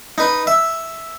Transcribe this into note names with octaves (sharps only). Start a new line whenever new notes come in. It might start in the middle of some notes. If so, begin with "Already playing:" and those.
D#4 B4
E5